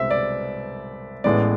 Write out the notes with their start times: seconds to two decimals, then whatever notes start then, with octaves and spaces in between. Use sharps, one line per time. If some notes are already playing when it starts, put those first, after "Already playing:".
Already playing: C2 B2 G#3 C4 E5
0.11 D5
1.24 A1 A2 G#3 B3 D5